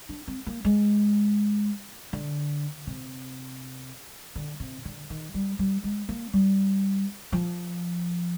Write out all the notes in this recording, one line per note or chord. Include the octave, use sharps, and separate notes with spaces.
D4
C4
A#3
G#3
D3
C3
D3
C3
D3
D#3
G3
G3
G#3
A#3
G3
F3